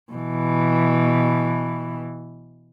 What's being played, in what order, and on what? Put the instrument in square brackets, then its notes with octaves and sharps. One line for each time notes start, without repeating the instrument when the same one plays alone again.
[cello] B2 E3